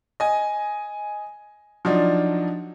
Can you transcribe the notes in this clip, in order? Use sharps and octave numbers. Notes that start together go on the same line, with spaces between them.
D#5 G#5
F3 F#3 D4 D#4